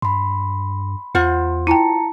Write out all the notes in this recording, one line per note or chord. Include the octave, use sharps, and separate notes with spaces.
G2 B5 C6
E2 F4 C5 F#5
E4 G5 A5 A#5 C#7